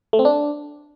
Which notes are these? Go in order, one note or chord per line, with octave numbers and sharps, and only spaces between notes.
A3
C4
D4